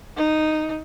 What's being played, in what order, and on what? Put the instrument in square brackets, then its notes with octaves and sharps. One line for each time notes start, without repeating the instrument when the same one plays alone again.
[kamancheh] D#4